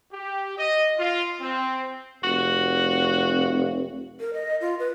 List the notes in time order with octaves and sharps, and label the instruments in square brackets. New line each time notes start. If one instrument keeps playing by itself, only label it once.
[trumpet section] G4
D#5
F4
C4
[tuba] F1 [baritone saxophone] F#4
[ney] A#4
D#5
F4
B4